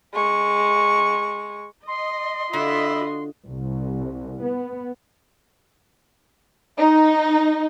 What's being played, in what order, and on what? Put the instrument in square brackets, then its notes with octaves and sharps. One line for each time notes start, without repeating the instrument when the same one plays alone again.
[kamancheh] G#3 C#6
[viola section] D#5 [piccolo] C6
[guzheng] D3 [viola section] F4 F#4 D#5 [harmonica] E5 B5
[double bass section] C2
B3
[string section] D#4